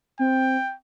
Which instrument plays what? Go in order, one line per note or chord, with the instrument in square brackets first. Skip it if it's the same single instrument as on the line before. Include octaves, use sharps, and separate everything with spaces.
[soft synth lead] C4 [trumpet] G5